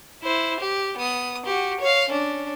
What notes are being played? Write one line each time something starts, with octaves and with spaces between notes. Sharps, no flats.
E4 C5
G4
B3 D#6
F#4 G4
C#5 F5
C#4 D4